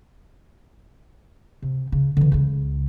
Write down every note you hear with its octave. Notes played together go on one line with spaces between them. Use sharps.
C3
C#3
D3 E3
C#2 C#3